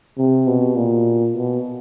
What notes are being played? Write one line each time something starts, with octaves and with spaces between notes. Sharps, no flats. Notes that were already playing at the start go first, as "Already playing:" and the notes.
C3
B2
A#2
B2